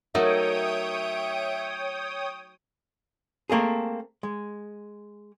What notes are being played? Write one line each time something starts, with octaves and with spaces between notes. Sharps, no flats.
F#3 A3 D#4 A#4 C#5 E5 G5 D#6
A3 A#3 C4 G#4
G#3